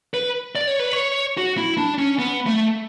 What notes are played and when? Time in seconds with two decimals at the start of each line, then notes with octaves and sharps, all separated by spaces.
0.14 B4
0.56 D5
0.67 C#5
0.79 B4
0.93 C#5
1.37 F#4
1.58 E4
1.78 D4
1.99 C#4
2.19 B3
2.46 A3